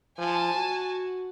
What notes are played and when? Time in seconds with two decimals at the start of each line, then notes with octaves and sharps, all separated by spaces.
0.18 F3 G#5 A5
0.54 F#4